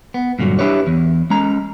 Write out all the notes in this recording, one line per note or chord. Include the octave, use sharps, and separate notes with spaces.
B3
G2 A#2 D3 F#3
D4 E4 G4 B4 C#5
E2
G#3 C#4 A#5